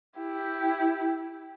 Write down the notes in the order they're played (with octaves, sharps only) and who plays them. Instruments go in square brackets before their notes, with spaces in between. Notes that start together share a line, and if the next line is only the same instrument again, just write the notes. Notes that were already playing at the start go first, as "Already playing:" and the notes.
[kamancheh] E4 G4